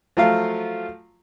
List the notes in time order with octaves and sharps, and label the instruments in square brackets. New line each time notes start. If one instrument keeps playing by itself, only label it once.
[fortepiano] F3 F#3 A3 F4 F5